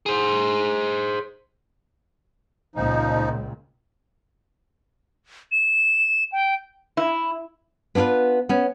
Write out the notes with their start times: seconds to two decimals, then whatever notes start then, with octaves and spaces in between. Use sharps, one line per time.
0.06 G#4 C5
2.75 C#2 A#2 F3 D#4
5.52 E7
6.32 G5
6.97 E4
7.95 B3 D4 E4 F4 B4
8.49 B3 C#4